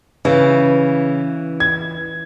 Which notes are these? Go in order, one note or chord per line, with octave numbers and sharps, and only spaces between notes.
C#3 E3
G#6